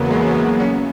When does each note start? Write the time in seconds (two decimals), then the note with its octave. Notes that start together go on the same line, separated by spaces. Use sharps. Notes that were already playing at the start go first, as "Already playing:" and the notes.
Already playing: E2 C#3 F#3 A#3 B3
0.11 G#3
0.35 A#3
0.60 C#4